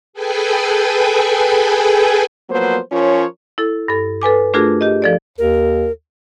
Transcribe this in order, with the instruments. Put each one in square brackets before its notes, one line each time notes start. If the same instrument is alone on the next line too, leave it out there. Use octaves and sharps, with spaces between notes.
[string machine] G#4 A4 B4 G5 G#5
[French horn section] F3 F#3 A#3 B3 B4 C5
F3 C#4 F4 A#4 C#5
[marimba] E4 A4
G2 A4
A4 B4 G#5 D6
A3 D4 F4 F#4 G#4 A#4
G4 D#5
F3 A4 D5
[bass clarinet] D#2 [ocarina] A#4